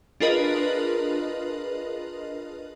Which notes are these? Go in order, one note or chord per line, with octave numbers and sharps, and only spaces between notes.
D4 F4 G#4 A#4 B4 D#5